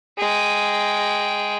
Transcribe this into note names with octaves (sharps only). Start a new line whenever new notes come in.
G#3 G5